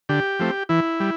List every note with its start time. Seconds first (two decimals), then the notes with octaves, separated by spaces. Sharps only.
0.09 D3 G4
0.39 F3 A3 C4
0.69 E3 E4
1.00 G3